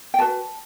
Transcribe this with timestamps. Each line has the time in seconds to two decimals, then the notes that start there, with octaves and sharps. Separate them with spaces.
0.14 G5
0.19 F#4 B4 A5